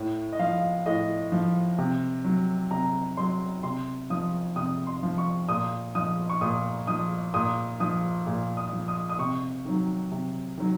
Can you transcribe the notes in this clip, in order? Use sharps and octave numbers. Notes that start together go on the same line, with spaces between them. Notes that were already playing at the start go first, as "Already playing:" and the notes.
Already playing: A2
D#5
F3 F5
A2 D#5
F3
C3
F#3
C3 A#5
F#3 C6
C3 C6
F3 D#6
C3 D#6
C6
F3
C#6
A#2 D#6
F3 D#6
C#6
A#2 D#6
F3 D#6
A#2 D#6
F3 D#6
A#2
D#6
F3
D#6
D#6
C3 C#6
D#3 F#3
C3
D#3 F#3